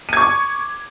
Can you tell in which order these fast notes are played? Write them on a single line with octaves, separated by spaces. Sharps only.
D#7 G#6 C#6 D6